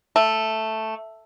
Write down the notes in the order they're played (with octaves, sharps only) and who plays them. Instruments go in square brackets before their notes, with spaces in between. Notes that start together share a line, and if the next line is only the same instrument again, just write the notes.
[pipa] A3